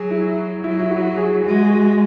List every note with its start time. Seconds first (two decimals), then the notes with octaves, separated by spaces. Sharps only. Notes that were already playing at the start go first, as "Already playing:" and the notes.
Already playing: F#3 G#4
0.11 E4
0.64 F#3 E4
0.80 E4
0.91 F#4
1.17 G#4
1.44 G#3 F#4
1.63 G#4
1.70 F#4